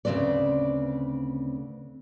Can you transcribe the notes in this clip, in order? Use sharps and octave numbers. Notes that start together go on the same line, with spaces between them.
D2 C#3 F#3 C4 B4 D5